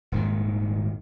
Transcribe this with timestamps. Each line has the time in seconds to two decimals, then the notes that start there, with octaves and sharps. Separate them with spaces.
0.12 D#1 G#2 D#3